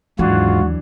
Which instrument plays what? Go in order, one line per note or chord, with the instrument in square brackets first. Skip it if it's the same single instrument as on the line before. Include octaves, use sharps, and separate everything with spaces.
[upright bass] D#2 [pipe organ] G#2 F4 [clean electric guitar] E3 F#3 D4 [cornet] F#4